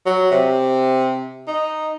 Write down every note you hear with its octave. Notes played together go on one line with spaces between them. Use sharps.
F#3
C3
D#4